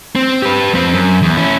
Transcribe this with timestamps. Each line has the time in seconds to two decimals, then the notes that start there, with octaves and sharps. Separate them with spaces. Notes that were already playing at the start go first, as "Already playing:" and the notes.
0.15 C4
0.42 G4 B4
0.74 F2 C4
0.94 F#2
1.22 E2
1.37 C#4 E4